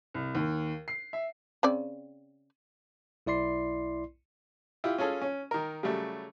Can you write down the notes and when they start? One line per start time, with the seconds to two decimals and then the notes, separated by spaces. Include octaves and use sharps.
0.14 C2
0.35 D#2
0.88 C7
1.13 E5
1.63 C#3 C4 D5
3.26 B1 E4 D5 C6 C7
4.84 E4 F4 G4
4.98 C#4 F4 G#4 A4
5.21 C#4
5.51 D#3 A#4
5.83 C#3 F#3 G3 A3